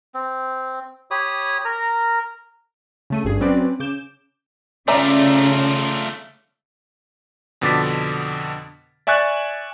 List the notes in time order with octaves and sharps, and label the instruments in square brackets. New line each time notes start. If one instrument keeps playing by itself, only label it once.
[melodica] C4
G4 C#5 B5 D#6
A#4 A#5
[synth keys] C#3 A3 D#7
G#1 G2 G#4
F#3 C4 C#4 B4 D5
C#3 D6 G6 E7
[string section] C#3 [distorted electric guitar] A3 F4 [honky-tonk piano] D5 E5 A#5
[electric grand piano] F2 B2 D3 D6 A6 B6
D5 E5 G#5 C#6 F#6 A6